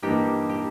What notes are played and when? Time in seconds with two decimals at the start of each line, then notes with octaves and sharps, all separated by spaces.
0.02 G2 E3 A#3 D#4 G4
0.49 G4